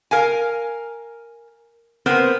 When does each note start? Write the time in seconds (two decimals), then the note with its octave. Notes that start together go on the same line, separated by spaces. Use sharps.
0.11 A#4 F5 G#5
2.06 B3 C4 A#4 C5